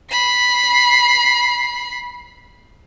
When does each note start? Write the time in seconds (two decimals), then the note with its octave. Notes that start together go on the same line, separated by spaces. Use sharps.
0.11 B5 C7